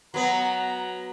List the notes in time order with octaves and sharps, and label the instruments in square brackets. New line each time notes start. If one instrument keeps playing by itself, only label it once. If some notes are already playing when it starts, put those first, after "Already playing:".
[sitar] F#3 B3 [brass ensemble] A#5